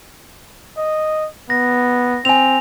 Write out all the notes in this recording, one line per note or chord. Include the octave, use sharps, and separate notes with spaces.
D#5
B3 A#6
C4 G#5 F7